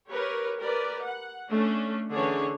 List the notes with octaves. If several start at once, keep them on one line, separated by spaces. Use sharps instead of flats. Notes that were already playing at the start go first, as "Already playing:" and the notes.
G4 A#4 B4 C#5
G4 A#4 B4 D5
F#5
A3 C#4 D4
D3 E3 C#4 D4 G#4 C#5